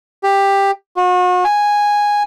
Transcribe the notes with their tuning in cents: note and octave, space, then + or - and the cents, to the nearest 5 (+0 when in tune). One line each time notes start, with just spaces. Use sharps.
G4 +10
F#4 -40
G#5 -5